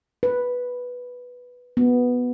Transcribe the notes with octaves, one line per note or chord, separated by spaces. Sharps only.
B4
B3